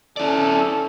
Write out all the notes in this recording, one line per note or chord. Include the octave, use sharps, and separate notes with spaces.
C#4 E4 A4 D5